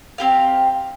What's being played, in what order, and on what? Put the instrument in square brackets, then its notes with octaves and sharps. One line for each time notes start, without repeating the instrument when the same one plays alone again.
[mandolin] C4 G4 F5